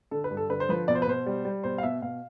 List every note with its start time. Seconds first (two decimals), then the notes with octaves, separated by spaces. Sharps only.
0.11 D3 A4
0.24 B4
0.31 G2
0.37 A4
0.50 D3 B4
0.60 C5
0.69 F3 B4
0.88 B2 D5
0.95 C5
1.02 B4
1.07 B2 C5
1.26 G3
1.45 G3
1.64 B2 C5
1.78 F5
1.83 B2 E5
2.02 B2 F5